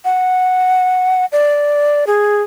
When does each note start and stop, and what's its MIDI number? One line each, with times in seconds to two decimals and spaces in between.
0.05 1.25 78
1.32 2.05 74
2.07 2.42 68